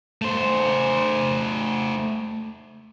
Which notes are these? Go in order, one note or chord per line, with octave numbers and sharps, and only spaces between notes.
A3 C5